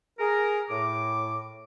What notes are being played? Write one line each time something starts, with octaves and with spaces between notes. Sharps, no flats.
G#4 A#4
A2 D6